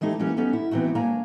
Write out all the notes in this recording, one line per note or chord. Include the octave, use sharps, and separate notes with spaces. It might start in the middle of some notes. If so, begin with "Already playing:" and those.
E3 G#3 A3 D#4 G4
E3 F#3 A#3 C#4 G4
B3 C#4 D#4 G4 A4
E4
E3 B3 C4 D#4 F#4
A#3 D4 C#5 G#5 A#5